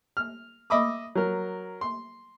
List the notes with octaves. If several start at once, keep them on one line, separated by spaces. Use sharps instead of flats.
F6
D#5 E5 B5 D6 D#6
F#3 A#4
C6